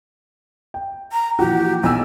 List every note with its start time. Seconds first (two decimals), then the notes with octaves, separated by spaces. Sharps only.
0.74 G5
1.12 A#5
1.39 A#2 E3 F3 F#4 G4
1.83 B1 G#5 E6